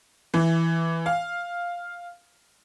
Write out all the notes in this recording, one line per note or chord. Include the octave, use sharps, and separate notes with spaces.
E3
F5